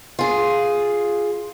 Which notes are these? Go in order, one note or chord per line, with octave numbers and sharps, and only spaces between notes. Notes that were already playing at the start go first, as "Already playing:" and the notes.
F4 G#4